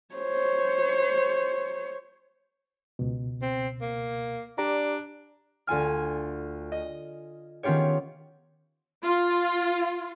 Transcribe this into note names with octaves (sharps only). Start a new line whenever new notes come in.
C5 C#5
C#2 B2
C4
A#3
D4 G4 D5 A#5
D2 F4 G#5 F6
D#5
D#3 B3 C#4 F4 G4 C#5
F4